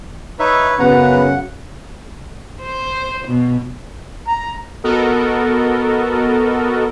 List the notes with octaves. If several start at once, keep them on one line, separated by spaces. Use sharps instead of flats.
D#4 B4 C#5 E5
F#2 C#3 B3 B4 F#5 A#5
C5
B2
A#5
B3 F#4 A4 A#4 D#5